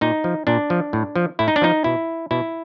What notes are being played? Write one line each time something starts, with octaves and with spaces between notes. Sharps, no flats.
A#2 D#4
F3
A#2 D4
F3
A2
F3
A2 E4
D#4
D4
F3 D#4
B2 E4
B2 E4